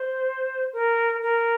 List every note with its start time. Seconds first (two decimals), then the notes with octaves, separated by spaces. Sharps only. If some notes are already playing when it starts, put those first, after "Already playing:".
Already playing: C5
0.73 A#4
1.22 A#4